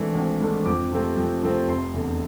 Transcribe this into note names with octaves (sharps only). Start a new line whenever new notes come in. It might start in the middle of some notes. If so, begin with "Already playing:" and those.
Already playing: G#1 G#2 E3 A3 D4
G#1
G#2 E3 A3 D4
F2 D6
C3 F3 A3 C4
F2
C3 F3 A3 C4
F1 C6
E2 D3